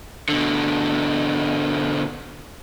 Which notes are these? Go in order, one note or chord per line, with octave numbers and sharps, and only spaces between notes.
B2 D3